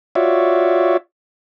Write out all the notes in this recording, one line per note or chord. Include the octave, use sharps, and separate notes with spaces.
F4 F#4 C#5 D5 E5